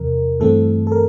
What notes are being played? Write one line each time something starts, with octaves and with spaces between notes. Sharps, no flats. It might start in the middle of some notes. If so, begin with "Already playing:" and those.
Already playing: E2 C3 F3 A#4
G2 E3 A3 C4 A4
A4
A#4